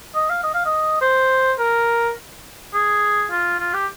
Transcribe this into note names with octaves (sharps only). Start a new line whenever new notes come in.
D#5
F5
D#5
F5
D#5
C5
A#4
G#4
F4
F4
G4